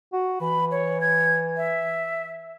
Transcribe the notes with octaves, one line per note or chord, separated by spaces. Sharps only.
F#4
E3 B5
C#5
G#6
E5